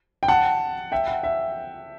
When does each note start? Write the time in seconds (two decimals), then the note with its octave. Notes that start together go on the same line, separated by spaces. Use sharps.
0.23 G5
0.28 F#5 A5
0.92 E5 G5
1.08 F#5
1.23 E5